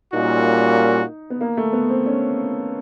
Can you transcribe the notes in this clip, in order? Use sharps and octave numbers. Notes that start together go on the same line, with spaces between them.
A#2 G3 A#3 C#4 D#4 F#4
B3
A#3
A3
B3
C4
C#4